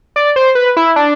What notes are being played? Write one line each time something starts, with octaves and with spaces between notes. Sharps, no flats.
D5
C5
B4
E4
D4